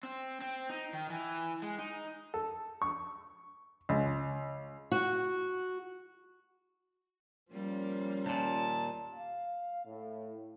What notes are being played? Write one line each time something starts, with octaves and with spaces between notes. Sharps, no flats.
C4
C4
D#4
D#3
E3
G#3
D#4
A4
C#6
C#2
F#4
F3 G3 A#3 C#4
D#2 A#2 A5
F5
A2